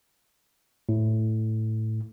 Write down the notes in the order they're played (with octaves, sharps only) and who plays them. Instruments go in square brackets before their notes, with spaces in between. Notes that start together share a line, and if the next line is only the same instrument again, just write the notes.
[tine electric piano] A2